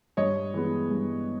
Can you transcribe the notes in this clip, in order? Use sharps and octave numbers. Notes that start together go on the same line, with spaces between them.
G2 C#5 D#5
E3 G#3 B3
G2